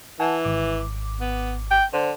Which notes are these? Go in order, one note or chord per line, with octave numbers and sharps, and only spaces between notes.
E3 F#5 G#5 A5
G#1 D6
B3
G5
D3 C5